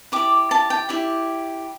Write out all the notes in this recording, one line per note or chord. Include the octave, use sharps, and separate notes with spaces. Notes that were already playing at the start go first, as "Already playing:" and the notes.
E4 G4 D5 D6
A5
G5
E4 G4 D5